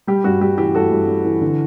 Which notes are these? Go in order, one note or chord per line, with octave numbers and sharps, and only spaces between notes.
G3 G4
G2 F#4
G3 G4
E3 G4
G2 F#4 A4
G2
G3
E3
D3